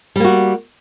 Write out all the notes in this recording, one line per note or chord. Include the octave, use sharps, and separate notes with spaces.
G3 A#3 F#4